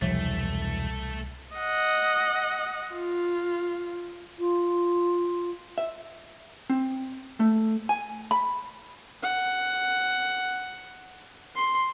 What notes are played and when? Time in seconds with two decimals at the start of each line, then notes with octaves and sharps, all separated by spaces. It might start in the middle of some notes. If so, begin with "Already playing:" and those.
0.02 E1 C2 F3 A3 E5
1.56 D#5 F#5
2.93 F4
4.39 F4
5.78 E5
6.70 C4
7.40 A3
7.89 G#5
8.31 B5
9.23 F#5
11.55 C6